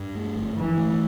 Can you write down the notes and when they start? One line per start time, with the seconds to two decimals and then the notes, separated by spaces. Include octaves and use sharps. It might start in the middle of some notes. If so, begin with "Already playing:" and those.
Already playing: G2
0.15 A3
0.35 G1
0.57 G1 E3
0.77 A3